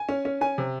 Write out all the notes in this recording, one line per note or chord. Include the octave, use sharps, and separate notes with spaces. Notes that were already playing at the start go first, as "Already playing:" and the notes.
Already playing: G#5
C#4
C#4
C#4 G#5
C3